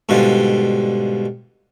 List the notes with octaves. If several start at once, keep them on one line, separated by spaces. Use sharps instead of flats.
G#2 B2 D3 G3 F4